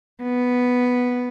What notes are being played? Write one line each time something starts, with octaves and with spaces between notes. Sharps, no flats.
B3